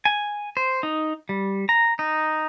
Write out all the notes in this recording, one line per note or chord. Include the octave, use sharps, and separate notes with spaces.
G#5
C5
D#4
G3
A#5
D#4